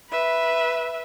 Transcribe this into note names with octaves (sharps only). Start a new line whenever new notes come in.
B4 E5